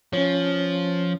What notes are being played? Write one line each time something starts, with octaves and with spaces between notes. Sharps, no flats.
F3 C#4 C#5